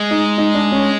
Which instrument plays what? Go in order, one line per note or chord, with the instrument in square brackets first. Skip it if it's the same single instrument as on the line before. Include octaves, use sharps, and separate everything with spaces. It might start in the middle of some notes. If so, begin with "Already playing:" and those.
Already playing: [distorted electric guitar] G#3
[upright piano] D#4
D#4
D4
C#4